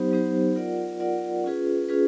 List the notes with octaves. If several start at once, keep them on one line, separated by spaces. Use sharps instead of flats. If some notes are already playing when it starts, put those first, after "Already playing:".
Already playing: F#3 B3 D#4 G4 C5
F#3 B3 D#4 G4 C5
F4 A#4 D5 F#5
F4 A#4 D5 F#5
C#4 F4 G#4 B4
C#4 F4 G#4 B4